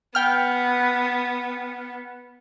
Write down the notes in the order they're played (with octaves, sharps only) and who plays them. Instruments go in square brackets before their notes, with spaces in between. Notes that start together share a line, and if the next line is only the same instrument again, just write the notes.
[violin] B3 [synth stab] G5 F6